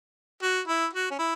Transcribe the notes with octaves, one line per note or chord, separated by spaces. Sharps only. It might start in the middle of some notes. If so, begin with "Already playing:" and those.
F#4
E4
F#4
C#4
E4